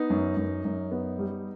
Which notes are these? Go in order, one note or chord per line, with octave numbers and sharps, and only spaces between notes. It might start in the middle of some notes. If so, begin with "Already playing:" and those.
Already playing: B3 D#4
F#2
F#2
F#2
B3
G3